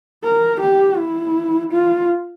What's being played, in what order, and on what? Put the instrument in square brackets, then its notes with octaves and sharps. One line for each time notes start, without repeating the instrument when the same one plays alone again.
[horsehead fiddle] A#4
G4
E4
F4